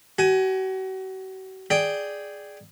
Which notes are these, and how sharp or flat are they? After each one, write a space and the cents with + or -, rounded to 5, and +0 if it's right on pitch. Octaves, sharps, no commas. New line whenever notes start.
F#4 +40 G#5 +15
G#4 +0 D5 +0 G5 +0